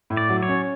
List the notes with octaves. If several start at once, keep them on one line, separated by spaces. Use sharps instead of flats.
A2
D5
F#3
C#5
C#4